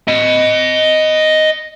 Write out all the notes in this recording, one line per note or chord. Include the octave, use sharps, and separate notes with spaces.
D#5 B5